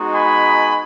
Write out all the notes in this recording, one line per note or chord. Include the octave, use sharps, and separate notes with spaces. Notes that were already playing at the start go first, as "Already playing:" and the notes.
Already playing: G#3 B3 D#4 F#4
G#5 B5